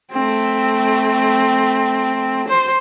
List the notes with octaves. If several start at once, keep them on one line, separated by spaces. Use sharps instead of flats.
A3 C4
C5